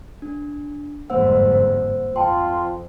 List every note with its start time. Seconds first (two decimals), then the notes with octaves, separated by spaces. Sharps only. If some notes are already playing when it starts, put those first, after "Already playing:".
0.22 D4
1.10 G1 F2 G#2 A#3 C5 F#5 E6
2.16 F2 F4 G5 A5 C6